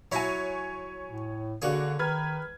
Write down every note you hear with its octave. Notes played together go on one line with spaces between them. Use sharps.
F#3 E4 F#4 C#5 G#5
A2
D3 A#3 D4 F#4 G#4 C#5
D#3 B4 F6 G#6